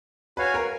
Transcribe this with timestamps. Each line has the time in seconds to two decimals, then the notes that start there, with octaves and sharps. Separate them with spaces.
0.37 F#4 B4 C#5 F5 G#5
0.54 A#4